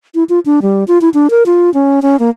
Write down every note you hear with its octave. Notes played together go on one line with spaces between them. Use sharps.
E4
F4
D4
G3
F4
E4
D4
A#4
F4
C#4
C#4
A#3